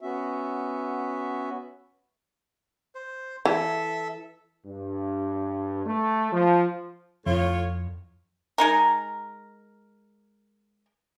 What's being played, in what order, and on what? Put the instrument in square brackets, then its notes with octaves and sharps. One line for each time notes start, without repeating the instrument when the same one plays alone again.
[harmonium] B3 C#4 F#4 E5
[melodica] C5
[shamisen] E3 [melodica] A4 E5
[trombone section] G2
A3
F3
[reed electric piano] F2 [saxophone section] A2 F4 C#5
[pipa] G#3 D#4 A#4